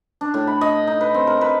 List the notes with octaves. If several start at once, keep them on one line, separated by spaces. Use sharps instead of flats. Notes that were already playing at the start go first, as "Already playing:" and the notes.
D4
A2
B5
D#5
D#4
B4
C4
A#4
B4